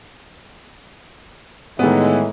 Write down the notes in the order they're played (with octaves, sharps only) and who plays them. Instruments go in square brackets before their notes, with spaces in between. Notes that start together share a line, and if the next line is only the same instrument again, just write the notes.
[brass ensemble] A2 E3 G#3 [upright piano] D#3 B3